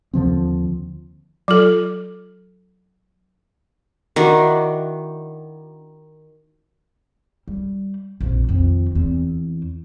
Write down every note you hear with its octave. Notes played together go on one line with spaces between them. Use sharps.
D#2 D3 F3 C4
F#3 F4 A4
D#3 D4 E4 F#4
G3
A#1 F2
F2 D#3
E2 C4